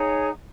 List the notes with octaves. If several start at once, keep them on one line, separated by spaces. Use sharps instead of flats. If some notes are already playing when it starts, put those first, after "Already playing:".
Already playing: D#4 G#4 C#5 F#5